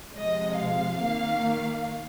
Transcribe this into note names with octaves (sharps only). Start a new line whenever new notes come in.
C3 F3 G#3 D#5
F5
D#3 A#3